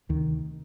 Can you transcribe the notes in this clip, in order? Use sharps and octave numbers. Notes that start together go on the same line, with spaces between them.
D2 C3 D#3